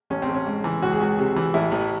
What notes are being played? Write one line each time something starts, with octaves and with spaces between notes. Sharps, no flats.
A1 C#4
C4
A1
C#4
G#2
E3
C#2 F#4
G#4
C#2 F#4
C3
E3
A1 E4
A1